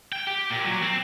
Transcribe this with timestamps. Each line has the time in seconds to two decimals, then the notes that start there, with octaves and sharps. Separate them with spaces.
0.12 G5
0.27 G4
0.50 A#2
0.65 F#3
0.83 C4